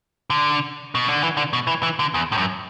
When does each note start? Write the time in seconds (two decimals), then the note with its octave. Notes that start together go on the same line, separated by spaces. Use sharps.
0.30 D3
0.95 B2
1.09 D3
1.22 E3
1.37 D3
1.53 B2
1.67 E3
1.83 E3
1.99 D3
2.14 E2
2.32 A2
2.38 F#2